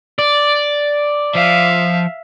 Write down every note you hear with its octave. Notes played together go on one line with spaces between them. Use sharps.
D5
F3 E5 F5